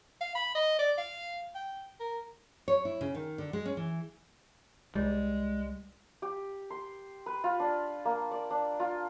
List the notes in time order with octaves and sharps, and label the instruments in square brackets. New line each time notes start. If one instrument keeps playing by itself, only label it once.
[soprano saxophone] F5
B5
D#5
D5
F5
G5
A#4
[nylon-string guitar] C#5
E4
C#3
D#3
D3
G#3
C#4
E3
[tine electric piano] C2 G3 [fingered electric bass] G#3
[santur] G4
C6
B4
F4
D4
A#3
D5
D4
F4